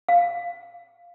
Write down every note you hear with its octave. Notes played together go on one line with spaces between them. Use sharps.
F5